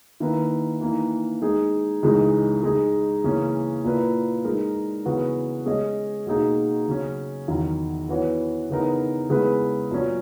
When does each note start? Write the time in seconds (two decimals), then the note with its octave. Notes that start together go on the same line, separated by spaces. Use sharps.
0.20 D#3 A#3 E4 B4
0.81 E3 A#3 D#4
1.42 G#3 D#4 G#4
2.03 C#2 C#3 E3 G#3 D#4
2.63 G#3 D#4 G#4
3.24 C#3 E3 A#3 C#4
3.84 A#2 A#3 E4 B4
4.45 G#3 D#4 A#4
5.05 C#3 E3 B3 F#4
5.66 G#3 C#4 G#4 D#5
6.26 B2 A#3 D#4 G#4
6.88 C#3 F#3 C#4
7.48 E2 D#3 F#3
8.09 E3 B3 F#4 C#5
8.70 C#3 E3 B3 D#4 A#4
9.30 C#3 G#3 B3 E4 B4
9.91 A#2 F#3 C#4